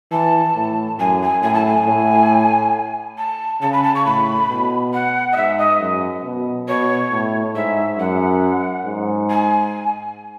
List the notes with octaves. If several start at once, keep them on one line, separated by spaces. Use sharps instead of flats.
E3 A5
A2
F#2 G#5
G#5
A2 G#5
A5
G#5
A2
A5
C#3 A5
B5
A5
C#6
A2 B5
B2
F#5
D#5
G#2 E5
D#5
F#2
B2
B2 C#5
A2
G#2 E5
F#2 F#5
G#2
G#5